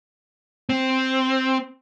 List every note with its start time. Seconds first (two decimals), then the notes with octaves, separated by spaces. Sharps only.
0.69 C4